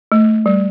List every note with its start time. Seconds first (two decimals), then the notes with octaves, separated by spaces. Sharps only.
0.12 A3
0.46 G3